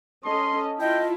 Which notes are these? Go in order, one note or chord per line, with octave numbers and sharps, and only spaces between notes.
C#4 A4 D#5 A5 C6
E4 F4 D#5 G5